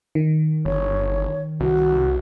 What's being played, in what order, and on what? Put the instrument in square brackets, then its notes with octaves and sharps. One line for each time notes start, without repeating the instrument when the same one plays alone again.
[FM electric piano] D#3
[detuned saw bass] G1 [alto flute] C#5
[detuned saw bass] C2 [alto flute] F#4